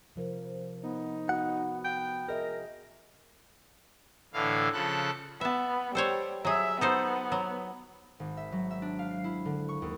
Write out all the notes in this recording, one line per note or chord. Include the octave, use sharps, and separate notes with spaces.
C3 F3 A#4
B3 D#4
B3 F#4 F#5
G5
G#4 A#4 D#5 E5
A2 D3 E3 F5
C#3 F3 A4 F#6
B3 E5 A5
G3 A4 C5 C#5
F#3 G#4 E5
B3 D#4 A4 C5
F#3
G#1
E5
F#3
E5
D4
F5
C7
E4
D3
C#6
D#2